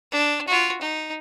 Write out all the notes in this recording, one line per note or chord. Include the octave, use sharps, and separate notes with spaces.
D4
F4 F#4
D#4